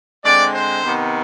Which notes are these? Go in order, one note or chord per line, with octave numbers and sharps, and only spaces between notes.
D3 G#3 C4 D5
C5
C3 D#3 B3